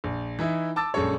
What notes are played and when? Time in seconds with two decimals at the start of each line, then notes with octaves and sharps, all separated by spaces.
0.04 A#1
0.39 E3 D#4 E4
0.76 A5 D6 E6 A6
0.94 A#1 F#2 G#3 A4 C#5